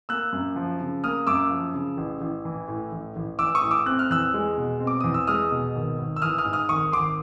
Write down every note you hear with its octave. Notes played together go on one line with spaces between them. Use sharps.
A#3 E6 F#6
F#2
F3
C#3
A#3 D#6 F6
F#2 D6 E6
F3
C#3
A1
A1
E3
A2
A1
A1
E3 D6 E6
C#6 D#6
A2
D6 E6
C4 F#6
F6
E2 E6 F#6
G#3
B2
C4
D6
E2 D#6
E6
G#3 D#6 F6
B2
G#1
G#1
E6
E3 D#6 F6
D#6 F6
G#2
D#6 F6
G#1 C#6 D#6
G#1 C6 D6